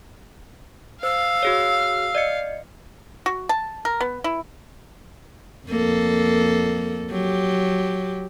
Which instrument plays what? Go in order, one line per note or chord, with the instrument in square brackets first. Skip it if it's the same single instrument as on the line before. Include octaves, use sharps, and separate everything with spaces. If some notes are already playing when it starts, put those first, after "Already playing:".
[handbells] C5 [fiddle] F5 [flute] E6
[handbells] F#4 G#4 C#5
D5 D#5 C#7
[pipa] F#4
A5
A#4
B3
E4
[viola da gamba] F2 A#3 A4
F#3 G4